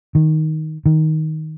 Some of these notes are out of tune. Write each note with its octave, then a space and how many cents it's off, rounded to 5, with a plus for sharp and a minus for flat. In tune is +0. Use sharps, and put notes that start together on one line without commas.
D#3 +5
D#3 +10